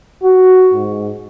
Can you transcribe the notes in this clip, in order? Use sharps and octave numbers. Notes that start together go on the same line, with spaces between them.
F#4
G#2